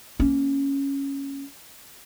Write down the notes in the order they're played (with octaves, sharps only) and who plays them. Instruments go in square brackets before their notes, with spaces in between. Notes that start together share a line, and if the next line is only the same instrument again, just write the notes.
[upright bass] A#3 C#4